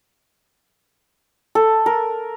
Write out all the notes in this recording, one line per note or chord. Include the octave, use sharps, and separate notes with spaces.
A4
A#4